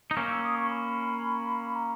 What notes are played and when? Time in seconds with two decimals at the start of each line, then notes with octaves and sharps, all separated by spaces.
0.11 D#4
0.17 A#3 C#4
0.30 E6
0.43 D#6
0.56 C#6
0.70 B5
1.74 A#5